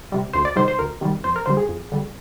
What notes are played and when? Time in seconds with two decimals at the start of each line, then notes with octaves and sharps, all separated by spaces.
0.12 C3 G3
0.33 D2 C5
0.45 D5
0.56 C3 D#3 G3 C5
0.68 C5
0.79 D2 A#4
1.01 C3 D#3 G3
1.24 F2 C5
1.36 A#4
1.46 D3 G3 C5
1.57 G#4
1.69 F2
1.92 D3 G3